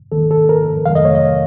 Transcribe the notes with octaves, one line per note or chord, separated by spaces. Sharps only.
D#2 D#3 A#3 A4
A4
A#4
F2 D#3 F#3 A3 F5
D#5
C#5
D#5